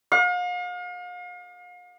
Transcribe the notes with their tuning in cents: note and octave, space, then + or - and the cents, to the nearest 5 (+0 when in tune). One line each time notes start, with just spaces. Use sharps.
F5 +40